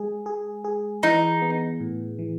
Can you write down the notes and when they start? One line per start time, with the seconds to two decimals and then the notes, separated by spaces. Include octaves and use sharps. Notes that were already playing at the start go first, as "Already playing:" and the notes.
Already playing: G#3 G#4
0.26 G#4
0.64 G#4
1.03 E3 D#4
1.42 B3
1.80 A2
2.19 E3